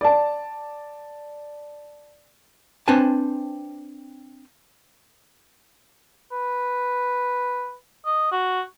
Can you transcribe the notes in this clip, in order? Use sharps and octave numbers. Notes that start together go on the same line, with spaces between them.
D5 A5
C4 D4 B4 C5 G#5 A5
B4
D#5
F#4